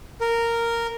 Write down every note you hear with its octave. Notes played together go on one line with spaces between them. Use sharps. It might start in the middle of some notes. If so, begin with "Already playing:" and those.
A#4